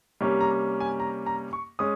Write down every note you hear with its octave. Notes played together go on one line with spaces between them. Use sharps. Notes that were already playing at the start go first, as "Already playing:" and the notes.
C3 G3 A#3 C#4
A#5
G#5
A#5
A#5
C#6
G#3 C#4 D#6